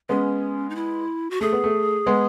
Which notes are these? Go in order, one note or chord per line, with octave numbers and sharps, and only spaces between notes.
G#3 B3 C#4
D#4
E4
F#4
A3 G#4
B3
A3
G#3 B3